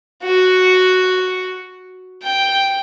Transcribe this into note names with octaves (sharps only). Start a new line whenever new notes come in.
F#4
G5